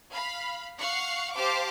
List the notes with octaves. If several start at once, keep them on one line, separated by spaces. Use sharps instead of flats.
F5 B5
F5 F#5 C#6 C7
G4 C5 F5 A5 D6